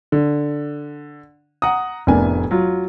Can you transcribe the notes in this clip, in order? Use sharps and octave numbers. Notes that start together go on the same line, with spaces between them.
D3
F#5 A#5 D#6
F1 A2 B3 D4 A#4 G#5
F#3 F4